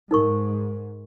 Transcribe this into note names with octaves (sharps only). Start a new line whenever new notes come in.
G#2 D#4 A#4 C#6